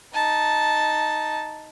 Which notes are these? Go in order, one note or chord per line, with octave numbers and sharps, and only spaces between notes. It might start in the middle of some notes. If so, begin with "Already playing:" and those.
D#4 A5